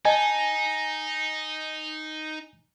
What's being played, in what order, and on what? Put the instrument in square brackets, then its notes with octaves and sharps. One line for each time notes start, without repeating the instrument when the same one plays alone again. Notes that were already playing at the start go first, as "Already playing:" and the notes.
[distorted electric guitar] D#4 [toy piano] D#5 A5 [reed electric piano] G#5